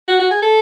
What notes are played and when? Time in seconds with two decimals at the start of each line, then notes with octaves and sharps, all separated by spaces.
0.08 F#4
0.20 F#4
0.31 G#4
0.42 A4